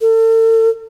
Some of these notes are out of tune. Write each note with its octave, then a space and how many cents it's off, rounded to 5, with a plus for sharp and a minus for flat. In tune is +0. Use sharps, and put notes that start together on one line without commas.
A4 +40